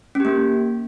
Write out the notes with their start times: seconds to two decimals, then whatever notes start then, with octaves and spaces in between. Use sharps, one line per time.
0.15 C#4
0.20 G4
0.25 A#3